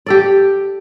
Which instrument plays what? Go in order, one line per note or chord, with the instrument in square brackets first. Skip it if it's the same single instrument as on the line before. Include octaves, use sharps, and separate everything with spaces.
[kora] G4 A4 D5